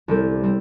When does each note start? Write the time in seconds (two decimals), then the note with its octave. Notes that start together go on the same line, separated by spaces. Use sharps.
0.08 C2 C3 G3 C4
0.43 G3 C4